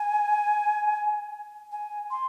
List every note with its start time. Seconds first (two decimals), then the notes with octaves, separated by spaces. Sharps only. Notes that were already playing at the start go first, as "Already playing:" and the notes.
Already playing: G#5
1.72 G#5
2.11 C6